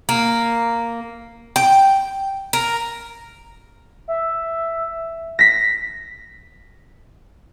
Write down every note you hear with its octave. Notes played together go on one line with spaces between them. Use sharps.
A#3
G5
A#4
E5
A#6 B6